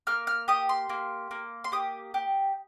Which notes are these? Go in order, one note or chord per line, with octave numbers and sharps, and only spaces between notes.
A#3 F6
F6
G4 D#6
C6
A#3
A#3
C6
G4 D#6
G4